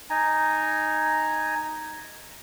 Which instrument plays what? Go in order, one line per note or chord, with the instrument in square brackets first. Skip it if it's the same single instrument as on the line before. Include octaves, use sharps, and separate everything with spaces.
[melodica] D#4 G#5 A#5